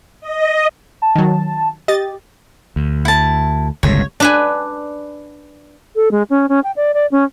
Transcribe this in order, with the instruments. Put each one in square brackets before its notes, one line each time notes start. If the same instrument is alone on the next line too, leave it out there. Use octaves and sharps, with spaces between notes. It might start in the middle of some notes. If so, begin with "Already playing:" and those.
[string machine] D#5
[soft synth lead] A5
[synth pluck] D#3 F#3
[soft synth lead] G4 [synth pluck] D#5 A6
[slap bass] D2
[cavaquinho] E4 A5
[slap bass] G1 C#2 A2 [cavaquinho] C#5
[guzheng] D4 B4 G#5
[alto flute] A4
G#3
C#4
C#4
G5
D5
D5
C#4